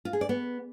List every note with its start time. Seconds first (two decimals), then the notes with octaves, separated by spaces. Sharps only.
0.05 F4
0.13 G#4
0.21 D5
0.29 B3